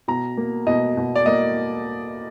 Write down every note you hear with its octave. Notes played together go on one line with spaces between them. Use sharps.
B2 A#5
A#3
B2 D#5
B2
D5
A#3 D#5